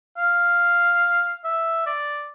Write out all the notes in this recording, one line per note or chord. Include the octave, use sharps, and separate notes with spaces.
F5
E5
D5